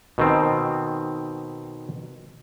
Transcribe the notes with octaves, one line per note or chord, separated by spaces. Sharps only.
B2 D#3 C4